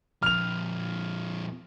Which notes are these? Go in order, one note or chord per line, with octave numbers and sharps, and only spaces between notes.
F2 A#2 F6 F7